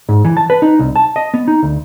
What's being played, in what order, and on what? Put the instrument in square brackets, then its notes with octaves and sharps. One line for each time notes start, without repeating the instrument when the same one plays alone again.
[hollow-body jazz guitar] G#2
E3
A5
B4
D#4
C2
A5
D#5
B3
D#4
D2